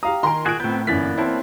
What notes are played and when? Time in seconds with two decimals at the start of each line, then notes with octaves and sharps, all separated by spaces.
0.03 G4 F5 A#5 D#6
0.23 D#3 A#4 G#5 A#5 C6
0.46 A#2 F#4 G#4 F#6 D7
0.60 A2 B3 C4 G6
0.87 G1 E3 A#3 B3 C#4 D5 B6
1.18 C4 E4 C#5 A5